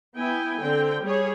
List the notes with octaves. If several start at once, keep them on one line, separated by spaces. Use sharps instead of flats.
B3 E4 G5 G#5
D3 C4 G5
G3 G#4 C#5